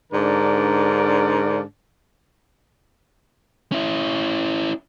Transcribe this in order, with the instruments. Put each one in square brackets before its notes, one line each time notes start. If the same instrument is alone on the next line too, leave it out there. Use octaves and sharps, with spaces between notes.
[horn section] G#2 D3 D4 A#4 D5
[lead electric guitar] C#4 E4